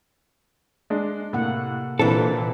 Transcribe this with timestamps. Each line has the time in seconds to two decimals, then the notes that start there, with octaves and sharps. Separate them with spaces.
0.90 G#3 D4
1.33 A2 C3 A#3 F#5
1.99 A#2 E3 C4 D4 E4 A4 B4